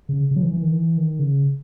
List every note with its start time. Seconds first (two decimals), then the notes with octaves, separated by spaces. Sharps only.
0.09 C#3
0.31 C#3
0.36 F#3
0.42 E3
0.53 E3
0.62 D#3
0.72 E3
0.97 D#3
1.19 C#3